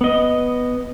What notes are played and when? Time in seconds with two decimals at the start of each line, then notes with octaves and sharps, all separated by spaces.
0.01 B3 D#5